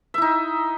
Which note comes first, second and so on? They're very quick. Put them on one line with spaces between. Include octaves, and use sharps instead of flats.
E5 E4 D#4